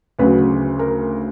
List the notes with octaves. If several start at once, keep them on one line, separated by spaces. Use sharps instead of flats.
D2 C#3 F#3 B4
A#4